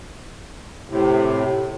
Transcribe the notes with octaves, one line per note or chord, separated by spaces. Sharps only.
A2 C3